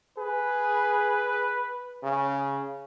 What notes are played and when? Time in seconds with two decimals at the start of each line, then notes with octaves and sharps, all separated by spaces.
0.18 G#4 B4
2.03 C#3